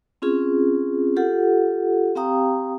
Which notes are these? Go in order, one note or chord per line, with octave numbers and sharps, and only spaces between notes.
C4 C#4 F4 G#4
F4 G4 A4 F#5
C4 G4 F5 G5 A#5 D#6